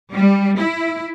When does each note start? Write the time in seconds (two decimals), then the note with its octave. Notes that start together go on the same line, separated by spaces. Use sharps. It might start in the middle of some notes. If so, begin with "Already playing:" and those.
0.12 G3
0.58 E4